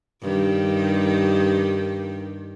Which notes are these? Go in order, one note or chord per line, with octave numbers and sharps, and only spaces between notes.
G2 D#3 G4